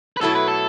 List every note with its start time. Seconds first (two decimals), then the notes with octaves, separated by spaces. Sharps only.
0.17 B4
0.21 B2 F#3 A3 E4 A4
0.35 B4
0.48 A4